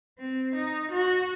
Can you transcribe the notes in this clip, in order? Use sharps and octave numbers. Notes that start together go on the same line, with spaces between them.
C4
D#4
F#4